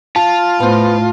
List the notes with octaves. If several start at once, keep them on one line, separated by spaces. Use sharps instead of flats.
F4 A5
A2 B3 C5